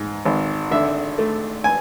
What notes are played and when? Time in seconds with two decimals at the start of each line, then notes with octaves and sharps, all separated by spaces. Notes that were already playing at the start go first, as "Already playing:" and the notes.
Already playing: G#2
0.25 G#1
0.71 D3 E5
1.18 A3
1.64 G#5